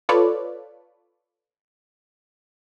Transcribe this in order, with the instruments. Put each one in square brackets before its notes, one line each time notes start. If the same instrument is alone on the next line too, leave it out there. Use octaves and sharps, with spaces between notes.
[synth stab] F4 A4 B4 C#5 D5